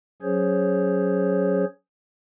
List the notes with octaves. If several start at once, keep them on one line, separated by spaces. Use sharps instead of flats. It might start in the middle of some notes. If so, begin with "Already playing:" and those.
F#3 C#4 G#4 C5 C#5